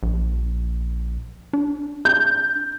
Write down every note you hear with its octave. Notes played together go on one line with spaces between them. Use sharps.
A#1
D4
G6